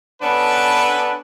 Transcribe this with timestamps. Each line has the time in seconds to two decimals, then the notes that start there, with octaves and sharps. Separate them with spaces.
0.22 B3 C#4 D4 A4 B4